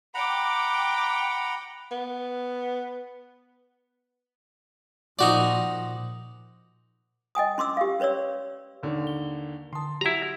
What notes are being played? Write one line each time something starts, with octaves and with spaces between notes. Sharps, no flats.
F#5 G5 A#5 B5 D6
B3
A#2 F3 D#4 F#4 D5
D#5 G5 G#5 D#6
C#4 C6 D6 E6
G4 F5
C#4 B4 C#5 D5 E6
D#2 D3 D#3
G7
D3 A5 C6 D#6
F#3 E4 G4 F#5 A#5